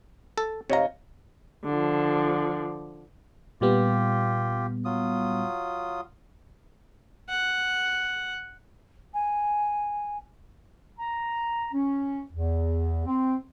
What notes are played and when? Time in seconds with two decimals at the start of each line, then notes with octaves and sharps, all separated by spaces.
0.38 A4
0.70 C3 C#5 D#5 F5 A#5
1.64 D3 F3
3.61 A#2 G3 B3 F4 G4
4.85 F#3 F4 D#6
7.29 F#5
9.13 G#5
10.99 A#5
11.73 C#4
12.32 E2
13.06 C4